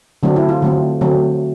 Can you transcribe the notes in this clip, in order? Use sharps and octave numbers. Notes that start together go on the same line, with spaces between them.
D3 F#3 A3 C4 D4
E4
F4
D3 F#3 A3 C4
D3 F#3 A3 C4